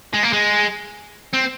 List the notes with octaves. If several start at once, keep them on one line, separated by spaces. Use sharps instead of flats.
G#3
A#3
G#3
C4